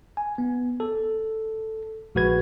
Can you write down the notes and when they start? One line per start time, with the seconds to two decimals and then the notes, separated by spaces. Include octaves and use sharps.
0.17 G#5
0.38 B3
0.80 A4
2.15 A#1 G#3 F#4 B4 G#6